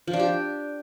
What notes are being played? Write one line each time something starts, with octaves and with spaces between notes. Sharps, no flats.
F3
D4
G4